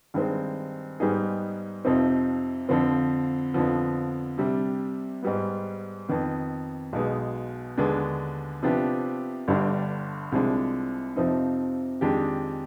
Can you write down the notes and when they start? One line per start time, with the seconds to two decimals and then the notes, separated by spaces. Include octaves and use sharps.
0.14 G2 D#3 G#3 C4
1.00 G#2 G3 B3 D#4 G#4
1.85 F2 C3 F3 C4 D#4
2.69 F2 D3 F3 C4
3.54 F2 D3 F3 B3
4.38 C3 G3 D4
5.23 G#2 G3 B3
6.09 F2 D#3 B3
6.93 B1 B2 G#3
7.77 D#2 D3 G#3 B3 D4
8.62 C3 F3 B3 D4 G4
9.48 G1 G2 D3 G3 D4
10.32 C2 C3 F3 G#3 D4
11.16 F2 C3 F3 C4 D#4
12.01 F2 D#3 G#3 D4 G4